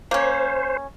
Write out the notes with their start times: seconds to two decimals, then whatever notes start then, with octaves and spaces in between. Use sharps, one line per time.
0.11 A#3 C#4 C5